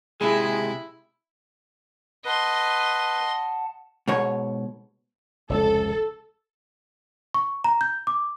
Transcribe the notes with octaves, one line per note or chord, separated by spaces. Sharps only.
C3 G#3 E4 G#4
B4 D#5 F#5 A5 C6
G#2 B2 C#5
F1 C#2 A4
C#6
A#5
G6
D6